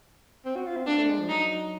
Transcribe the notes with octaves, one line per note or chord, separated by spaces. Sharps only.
C4
F#4
F4
C4
A#3 D4
A3
G#3
F3
F#3 D#4